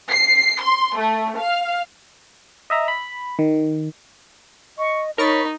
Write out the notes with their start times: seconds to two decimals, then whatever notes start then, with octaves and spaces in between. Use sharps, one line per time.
0.11 C7
0.62 C6
0.98 A3
1.39 F5
2.70 D#5 E5 A#5
2.88 B5
3.39 D#3
4.78 D#5 C#6
5.18 D#4 A#4 C#5 B5 C#6 A6